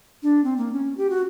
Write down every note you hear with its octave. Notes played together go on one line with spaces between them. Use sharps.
D4
C4
A#3
C#4
G4
F#4